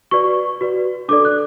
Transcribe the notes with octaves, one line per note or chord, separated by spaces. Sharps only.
F#4 B4 D5 C#6
F#4 B4 D5
D4 A4 D5 D6
F#6